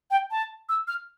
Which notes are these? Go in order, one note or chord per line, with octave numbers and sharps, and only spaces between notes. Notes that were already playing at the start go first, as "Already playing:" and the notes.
G5
A5
E6
F6